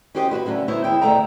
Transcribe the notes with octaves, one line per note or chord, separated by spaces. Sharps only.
C#4 F#4 G4 C5 D5 D#5
E4 F#4 G4 B4
D3 F#3 A3 C#4
B3 E4 C5 C#5
D#2 E4 G#4 G5
D2 B2 A3 F#5 G5 A#5